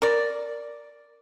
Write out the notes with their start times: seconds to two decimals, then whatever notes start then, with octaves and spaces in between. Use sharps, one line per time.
0.02 A#4 D5